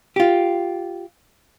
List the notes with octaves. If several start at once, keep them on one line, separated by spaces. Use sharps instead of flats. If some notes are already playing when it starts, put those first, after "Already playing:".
F4 G4